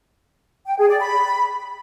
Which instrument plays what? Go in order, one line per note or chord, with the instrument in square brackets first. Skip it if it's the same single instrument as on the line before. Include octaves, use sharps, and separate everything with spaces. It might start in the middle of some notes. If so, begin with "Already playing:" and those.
[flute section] G5
G#4
D5
B5